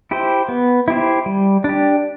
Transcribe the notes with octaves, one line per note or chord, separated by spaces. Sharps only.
E4 G4 C5
B3
E4 G4 C5
G3
D4 G4